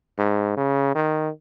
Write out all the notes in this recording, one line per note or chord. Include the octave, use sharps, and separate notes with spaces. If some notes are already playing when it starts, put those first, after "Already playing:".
G#2
C#3
D#3